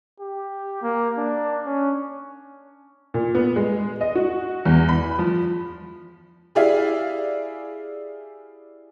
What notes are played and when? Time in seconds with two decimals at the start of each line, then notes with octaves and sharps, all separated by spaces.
0.20 G4
0.82 A#3
1.18 D4
1.66 C#4
3.14 A#2
3.35 B3
3.56 G#3
4.01 D#5
4.15 F#4
4.65 E2
4.89 B5
5.19 F3
6.55 E4 G4 G#4 D5 E5 F5